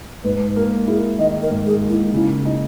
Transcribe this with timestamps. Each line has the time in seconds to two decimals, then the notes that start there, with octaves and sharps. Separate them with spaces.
0.24 G#2 B4
0.56 A#3 A#4
0.87 E4 G#4
1.19 D#3 D#5
1.42 A#4
1.51 G#2
1.66 G#4
1.82 A#3
1.90 E4
2.13 C#3 E4
2.45 D#4